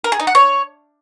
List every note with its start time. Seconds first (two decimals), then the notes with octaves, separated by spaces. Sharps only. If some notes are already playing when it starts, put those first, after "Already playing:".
0.04 A#4
0.12 G#4
0.20 D#4
0.27 F#5
0.35 C#5